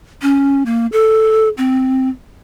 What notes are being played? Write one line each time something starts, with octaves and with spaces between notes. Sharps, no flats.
C#4
A#3
A4
C4